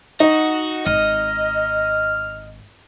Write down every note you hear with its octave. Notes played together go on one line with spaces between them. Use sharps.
D#4 F#4
G#1 D#5 F6